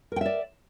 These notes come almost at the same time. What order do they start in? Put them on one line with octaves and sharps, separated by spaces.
A#4 G5 E5 D5